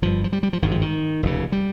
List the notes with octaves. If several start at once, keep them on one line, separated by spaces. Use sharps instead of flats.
G1 G2 F3
F3
G3
G3
F3
G#1 G2 D#3
F3
D#3
F1 D#2 C#3
G3